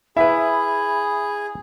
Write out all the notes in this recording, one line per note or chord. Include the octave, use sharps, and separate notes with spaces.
E4 G#4 B4 E5 B5